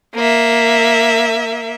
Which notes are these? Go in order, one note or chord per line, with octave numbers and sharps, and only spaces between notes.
A#3 E5